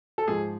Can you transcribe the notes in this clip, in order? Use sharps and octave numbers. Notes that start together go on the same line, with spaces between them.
A4
G#2 F3 G#4